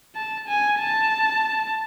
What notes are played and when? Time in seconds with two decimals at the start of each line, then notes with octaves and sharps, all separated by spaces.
0.16 A5
0.48 G#5
0.80 A5